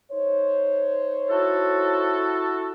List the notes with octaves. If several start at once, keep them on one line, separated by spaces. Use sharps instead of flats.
D#4 C5 C#5
E4 F#4 A4